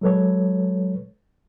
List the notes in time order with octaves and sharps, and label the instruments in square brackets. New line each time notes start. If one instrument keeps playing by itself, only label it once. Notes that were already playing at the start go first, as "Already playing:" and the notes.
[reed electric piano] F#3 G#3 A4 B4 C#5